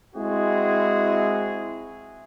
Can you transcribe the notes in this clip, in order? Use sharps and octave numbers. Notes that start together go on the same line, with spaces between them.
G#3 C4 E4 F#4 G#4